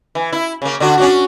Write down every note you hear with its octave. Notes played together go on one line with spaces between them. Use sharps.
E3
E4
C#3 A#3
D3 D4 F#4
C#4 D4 F#4